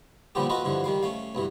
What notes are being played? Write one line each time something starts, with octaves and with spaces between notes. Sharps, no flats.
A#2 D3 F3 G3 B3 G4
F4 F#4 A4 B4 D#5
G2 D3 E3 F3
D#3 G3 F5
A3 C#4 F5
B1 G2 E3